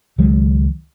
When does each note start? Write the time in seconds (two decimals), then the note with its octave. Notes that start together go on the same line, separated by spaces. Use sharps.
0.18 C#2 D#3 F#3 G#3